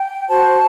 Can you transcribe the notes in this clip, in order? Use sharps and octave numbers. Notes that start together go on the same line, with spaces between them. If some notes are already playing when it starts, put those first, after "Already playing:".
Already playing: G5
F#4 C5 A5